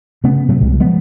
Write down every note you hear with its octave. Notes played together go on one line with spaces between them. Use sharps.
C#3 A3 B3 C#4
A#2 C#3 F#3 A3
C2 G#3
F3 G#3 B3